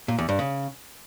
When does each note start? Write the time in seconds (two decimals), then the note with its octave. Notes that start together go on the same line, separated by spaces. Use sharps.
0.08 A#2
0.18 E2
0.29 G2
0.39 C#3